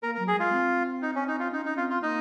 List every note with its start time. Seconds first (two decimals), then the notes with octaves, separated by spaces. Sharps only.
0.03 A#3 A#4
0.15 A#4
0.19 F#3
0.28 G#4
0.36 G#3 F4
0.52 C4
1.02 D#4
1.15 C#4
1.28 D#4
1.39 F4
1.52 C#4 D#4
1.65 D#4
1.77 C4 F4
1.90 F4
2.02 A#3 D#4